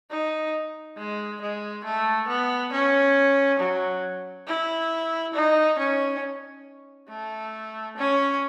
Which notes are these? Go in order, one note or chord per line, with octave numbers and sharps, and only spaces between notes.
D#4
G#3
G#3
A3
B3
C#4
F#3
E4
D#4
C#4
A3
C#4